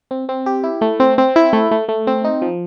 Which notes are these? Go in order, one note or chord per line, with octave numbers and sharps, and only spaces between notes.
C4
C4
G4
E4
A3
C4
C4
E4
A3
A3
A3
C4
D#4
F3